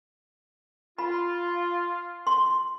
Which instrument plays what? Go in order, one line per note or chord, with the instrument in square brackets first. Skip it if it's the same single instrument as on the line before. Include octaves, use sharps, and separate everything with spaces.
[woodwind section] F4 [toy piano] B5
[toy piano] C6